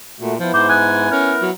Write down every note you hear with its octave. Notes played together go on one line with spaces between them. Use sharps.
A#2 A3 F#4
F3 B3 E4
G#2 C5 D6
G#5 F#6
C#4 A#4
F#3